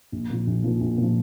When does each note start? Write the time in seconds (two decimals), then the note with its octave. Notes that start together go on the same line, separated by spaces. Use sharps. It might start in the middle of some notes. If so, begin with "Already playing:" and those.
0.12 A#1
0.30 A#2 F3
0.47 A#1
0.64 A#2 F3
0.81 A#1
0.98 A#2 F3